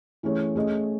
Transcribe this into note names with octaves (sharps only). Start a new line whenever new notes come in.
E3 A3 C#4 G#4 C#5
A3 C#4 G#4 D#5